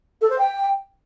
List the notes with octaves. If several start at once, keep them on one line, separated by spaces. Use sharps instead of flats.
A4
C5
G5